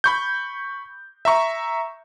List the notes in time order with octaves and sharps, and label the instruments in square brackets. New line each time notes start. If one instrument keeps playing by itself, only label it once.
[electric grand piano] B5 C#6 G6
E5 A#5 C#6